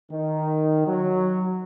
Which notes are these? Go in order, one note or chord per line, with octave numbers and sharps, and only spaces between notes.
D#3
F#3